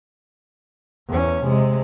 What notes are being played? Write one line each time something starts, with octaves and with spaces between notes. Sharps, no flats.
E2 C#4
C3 G#3